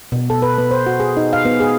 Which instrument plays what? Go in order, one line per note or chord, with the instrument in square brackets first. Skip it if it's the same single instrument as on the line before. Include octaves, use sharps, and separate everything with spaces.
[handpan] B2
A4
B4
B3
C5
F#4
G#4
D#4
F5
B3
G#4